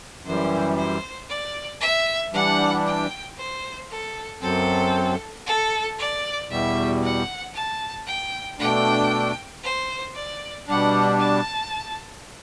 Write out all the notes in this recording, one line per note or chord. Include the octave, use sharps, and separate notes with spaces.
F#2 E3 G3 C5
C5
D5
E5
E3 G3 D4 F#5
G5
C5
A4
F#2 F#3 C4 A4
A4
D5
E2 B2 G3 E5
F#5
A5
G5
B2 A3 D4 G5
C5
D5
B2 G3 D4 F#5
A5